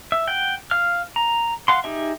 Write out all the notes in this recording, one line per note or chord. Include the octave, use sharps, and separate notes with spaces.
E5
F#5 G5
F5 F6
A#5
F5 F#5 C6
D#4 G4 G#4 E5